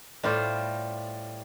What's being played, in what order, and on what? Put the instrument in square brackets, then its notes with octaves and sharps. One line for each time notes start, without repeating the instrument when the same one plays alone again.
[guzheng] A2 G3 F4 C5 [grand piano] D5